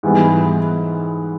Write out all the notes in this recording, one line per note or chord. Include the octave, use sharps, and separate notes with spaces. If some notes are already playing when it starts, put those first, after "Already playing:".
G#2 E3 G3 B3